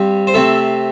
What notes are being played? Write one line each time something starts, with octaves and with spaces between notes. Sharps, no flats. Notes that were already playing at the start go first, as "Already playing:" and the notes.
Already playing: G2 G3 C4
C5
C3 A3 C4 A4